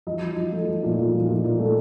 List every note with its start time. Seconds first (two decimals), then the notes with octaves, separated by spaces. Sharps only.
0.07 F3 D#5
0.22 F3
0.37 F3
0.52 A3
0.67 F3
0.83 A#2
0.99 A#2
1.14 F3
1.28 A#2
1.44 A#2
1.59 A3